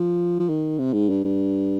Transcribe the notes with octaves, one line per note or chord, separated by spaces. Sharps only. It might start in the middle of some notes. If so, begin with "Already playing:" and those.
Already playing: F3
F3
D#3
C3
G#2
G2
G2